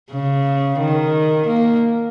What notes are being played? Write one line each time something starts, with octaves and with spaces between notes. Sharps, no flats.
C#3
D#3
A#3